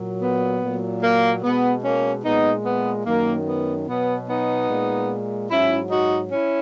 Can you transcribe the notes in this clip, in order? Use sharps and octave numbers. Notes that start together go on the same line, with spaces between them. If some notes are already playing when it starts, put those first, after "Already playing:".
Already playing: A#2 F#3
B3
A#2 F#3
A#3
B2 G#3 B3
A#3 C#4
A#2 G#3 B3 D#4
B3
F#2 D#3 F#3 A#3
B3
B2 F#3 B3
B3 D#4
A#2 G#3
G#2 F#3 C#4 E4
D#4 F#4
C#4 E4